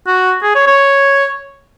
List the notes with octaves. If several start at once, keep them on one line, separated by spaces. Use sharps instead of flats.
F#4
G#4
C#5
C#5